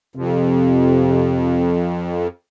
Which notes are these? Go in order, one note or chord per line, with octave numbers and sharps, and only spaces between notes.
F2 C3